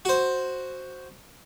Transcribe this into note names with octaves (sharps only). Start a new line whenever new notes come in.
F#4 C5